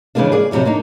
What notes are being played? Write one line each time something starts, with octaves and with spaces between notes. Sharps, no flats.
C#3 E3 F3 G#3 A#3 D4
G#4 D5
F2 C3 F3 F#3 E4
A#3 D4 D#4